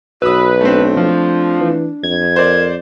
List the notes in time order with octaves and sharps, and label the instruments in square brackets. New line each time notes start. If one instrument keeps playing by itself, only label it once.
[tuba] B1 [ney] F#4 [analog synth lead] B4 [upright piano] D#6 E6
[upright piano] A3 C4 [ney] D4
[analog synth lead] F3
[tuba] E3
[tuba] F2 [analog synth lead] G#6
[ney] A#4 [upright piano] C5 D5